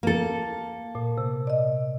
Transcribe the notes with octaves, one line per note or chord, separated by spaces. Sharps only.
A#3 A4
A#2
C3
D5 D#5